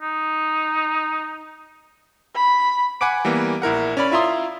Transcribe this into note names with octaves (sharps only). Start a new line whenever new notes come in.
D#4
B5
F#5 G#5 B5 D6 D7
E3 G3 A#3 B3
A#1 E4 A#4 F#5
C#4 D5 B5
E4 F4 E5 A#5 C6 D#6